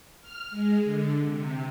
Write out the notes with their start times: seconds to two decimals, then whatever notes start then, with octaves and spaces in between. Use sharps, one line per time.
0.21 F6
0.50 G#3
0.84 D3
1.25 C3